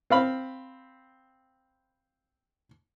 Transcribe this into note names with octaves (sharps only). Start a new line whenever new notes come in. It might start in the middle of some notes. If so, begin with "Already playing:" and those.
C4 F5 B5